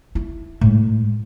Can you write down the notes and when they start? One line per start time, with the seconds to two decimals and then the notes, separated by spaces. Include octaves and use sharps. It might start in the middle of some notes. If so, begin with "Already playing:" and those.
0.15 E4
0.61 A2 G#3